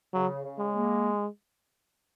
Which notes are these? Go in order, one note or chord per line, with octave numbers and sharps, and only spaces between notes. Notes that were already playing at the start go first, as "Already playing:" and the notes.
C#3 F#3
C#3
G#3
A#3